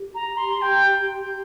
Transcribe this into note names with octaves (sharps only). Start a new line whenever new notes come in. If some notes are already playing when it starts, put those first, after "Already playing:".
Already playing: G4
A#5
C6
G5